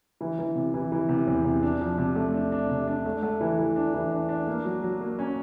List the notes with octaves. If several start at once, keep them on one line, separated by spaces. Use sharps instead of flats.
E3
E3
C3
E3
E3
C3
E2
C3
D4
F3
C3
A3
D4
D4
C3
D4
A3
A3
E3
E3
D4
E3
D4
D4
A#3
F#3
F#3
A#3
C#4